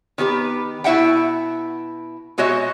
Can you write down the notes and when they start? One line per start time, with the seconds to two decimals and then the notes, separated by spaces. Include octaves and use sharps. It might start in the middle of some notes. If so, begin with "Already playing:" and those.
0.18 D#3 B3 G4 B4
0.84 B2 E4 E5 F#5 G5
2.38 B2 G#3 F#4 C#5 D#5 E5